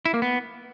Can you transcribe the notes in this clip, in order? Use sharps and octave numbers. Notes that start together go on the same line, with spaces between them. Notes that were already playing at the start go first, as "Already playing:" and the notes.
E4
A#3
B3